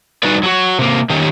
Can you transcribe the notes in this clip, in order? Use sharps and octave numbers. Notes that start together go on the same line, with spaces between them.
G3 D#4 F#4 G#4 B4 D5
F#3 F#4
C3 A#3
D#3 C#4 G4